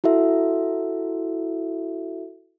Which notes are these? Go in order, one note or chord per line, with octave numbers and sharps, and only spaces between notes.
E4 F#4 A4 E5